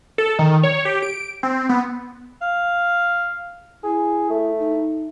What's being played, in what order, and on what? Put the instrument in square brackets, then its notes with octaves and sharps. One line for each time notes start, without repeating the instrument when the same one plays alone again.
[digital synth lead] A4
D#3
C#5
G4
D7
C4
B3
[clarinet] F5
[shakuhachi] E4 [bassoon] G#4
[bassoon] A3
[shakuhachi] D#4